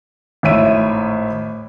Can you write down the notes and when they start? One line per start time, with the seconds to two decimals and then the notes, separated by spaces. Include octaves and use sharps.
0.43 G#1 A2 C#5 E5 D#7